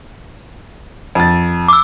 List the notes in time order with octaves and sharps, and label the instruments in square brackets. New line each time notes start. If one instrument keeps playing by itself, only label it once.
[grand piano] F2 A6
[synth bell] D6 E6